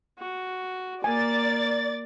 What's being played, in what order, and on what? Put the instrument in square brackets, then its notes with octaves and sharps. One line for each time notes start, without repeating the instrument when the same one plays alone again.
[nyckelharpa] F#4
[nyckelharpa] A#3 [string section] D5 A6 [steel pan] G#5